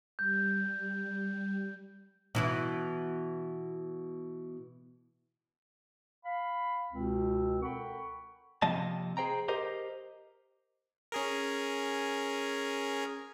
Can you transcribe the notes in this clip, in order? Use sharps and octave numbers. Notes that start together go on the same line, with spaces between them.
G3 G6
B2 E3 E4
F5 B5
C#2 B2 C4
A4 A#4 F#5 G5 B5 C#6
C3 F3 A#3 D#5 A5
G#4 C5 G5 A#5
G4 A#4 C5 D#5
C#4 G#4 A#4